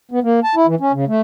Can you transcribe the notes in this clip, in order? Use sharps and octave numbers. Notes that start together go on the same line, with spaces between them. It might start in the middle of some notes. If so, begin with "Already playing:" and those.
B3
A#3
A5
E4
E3
C#4
C#3
A3